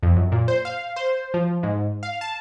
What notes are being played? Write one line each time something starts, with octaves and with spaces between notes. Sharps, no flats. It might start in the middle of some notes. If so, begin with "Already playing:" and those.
F2
F#2
A#2
C5
F5
C5
F3
G#2
F5
A5